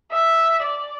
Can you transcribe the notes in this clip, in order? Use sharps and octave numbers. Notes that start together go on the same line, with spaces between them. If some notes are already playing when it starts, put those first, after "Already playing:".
E5
D5